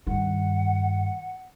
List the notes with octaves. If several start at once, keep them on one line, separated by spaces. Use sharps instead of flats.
G2 D#3 F#5